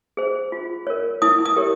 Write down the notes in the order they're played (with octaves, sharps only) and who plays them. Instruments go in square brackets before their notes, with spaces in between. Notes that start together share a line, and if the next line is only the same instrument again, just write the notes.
[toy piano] G#4 C5
F4
A#4 C#5
E4 D#6
D#6
G4 A#4 C#5